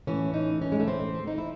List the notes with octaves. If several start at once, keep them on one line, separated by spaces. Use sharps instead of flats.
A2 E3 C#4
D#4
C#4
G#3
A3
C4
D#4
E4